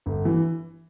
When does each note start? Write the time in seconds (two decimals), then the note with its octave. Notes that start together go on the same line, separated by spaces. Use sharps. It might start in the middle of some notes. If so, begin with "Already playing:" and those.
0.06 G1
0.25 E3